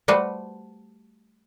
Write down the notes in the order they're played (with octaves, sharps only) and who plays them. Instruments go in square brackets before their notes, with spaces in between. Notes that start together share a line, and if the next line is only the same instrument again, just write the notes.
[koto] G3 A3 F#4 B4 C5